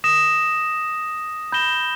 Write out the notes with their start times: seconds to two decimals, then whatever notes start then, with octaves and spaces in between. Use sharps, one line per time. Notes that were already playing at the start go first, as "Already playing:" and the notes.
0.04 D#6 A#6 E7
1.52 B5 G6 A#6 E7 G7